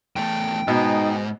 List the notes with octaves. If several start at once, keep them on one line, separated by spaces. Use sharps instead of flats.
E2 A3 G5
G#2 B2 D#4